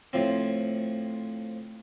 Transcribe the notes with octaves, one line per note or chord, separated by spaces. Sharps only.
A2 F3 C4